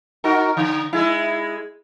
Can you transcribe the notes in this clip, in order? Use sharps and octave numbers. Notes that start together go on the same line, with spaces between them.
D#4 F#4 A#4
D3
G#3 E4